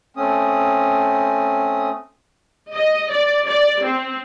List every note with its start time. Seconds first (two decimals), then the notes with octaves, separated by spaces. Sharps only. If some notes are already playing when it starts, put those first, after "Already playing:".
0.17 A3 C4 C#4 D#6
2.73 D#5
3.11 D5
3.47 D5
3.83 C4